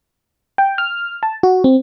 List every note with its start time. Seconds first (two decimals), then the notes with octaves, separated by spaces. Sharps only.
0.58 G5
0.78 F6
1.23 A5
1.43 F#4
1.64 C4